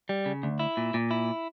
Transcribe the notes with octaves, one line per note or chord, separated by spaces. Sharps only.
G3
C#3
D2
E4
A#2
A#2
E4